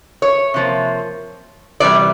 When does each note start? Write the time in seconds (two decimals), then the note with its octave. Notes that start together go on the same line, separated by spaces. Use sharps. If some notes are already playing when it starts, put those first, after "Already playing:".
0.22 C#5
0.54 C3 F3 A#3
1.80 C3 E3 G3 D5